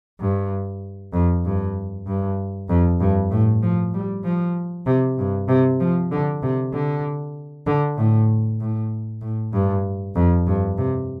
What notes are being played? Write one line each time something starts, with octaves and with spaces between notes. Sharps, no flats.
G2
F2
G2
G2
F2
G2
A2
F3
G3
F3
C3
G2
C3
F3
D3
C3
D3
D3
A2
A2
A2
G2
F2
G2
C3